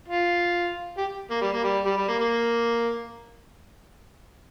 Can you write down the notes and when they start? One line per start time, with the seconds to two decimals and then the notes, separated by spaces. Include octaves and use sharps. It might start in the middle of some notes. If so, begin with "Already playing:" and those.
0.08 F4
0.97 G4
1.30 A#3
1.41 G3
1.52 A#3
1.63 G3
1.85 G3
1.97 G3
2.08 A#3
2.19 A#3